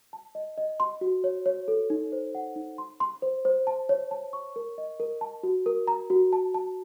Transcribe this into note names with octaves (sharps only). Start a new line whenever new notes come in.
A5
D#5
D#5
C6
F#4
C#5
C#5
A4
D#4
C5
F#5
D#4
C6
C6
C5
C5
A5
C#5
A5
C#6
A#4
D#5
A#4
A5
F#4
A#4
A#5
F#4
A5
A5